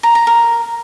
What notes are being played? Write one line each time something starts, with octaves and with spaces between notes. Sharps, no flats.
A#5
A#5
A#4